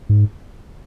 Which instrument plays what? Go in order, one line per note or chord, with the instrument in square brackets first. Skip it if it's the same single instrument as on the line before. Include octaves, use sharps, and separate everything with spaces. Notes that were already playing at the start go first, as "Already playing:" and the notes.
[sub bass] G#2